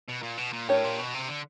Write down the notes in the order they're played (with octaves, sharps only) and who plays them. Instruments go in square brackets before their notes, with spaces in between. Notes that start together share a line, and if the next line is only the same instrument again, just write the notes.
[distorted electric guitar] B2
A#2
B2
A#2
[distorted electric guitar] A2 [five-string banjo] D4 G4 A#4 C#5
[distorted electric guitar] A#2
B2
C3
D3